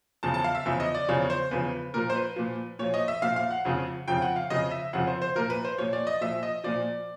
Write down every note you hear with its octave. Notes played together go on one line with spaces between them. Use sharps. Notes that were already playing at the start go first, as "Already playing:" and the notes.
E2 C#3 F3 A5
A5
F5
E5
E2 C#3 F3 E5
D#5
D5
E2 C#3 F3 C#5
C5
E2 C#3 F3 B4
A#2 F3 A#4
C5
B4
A#2 F3
A#2 F3 C#5
D#5
E5
A#2 F3 F5
F5
F#5
F2 C#3 F3
F2 C#3 F3 G5
F#5
F5
F2 C#3 F3 D#5
E5
F2 C#3 F3 F#5
C5
C5
A#2 F3 A#4
B4
C5
A#2 F3 C#5
D5
D#5
A#2 F3 E5
D#5
A#2 F3 D5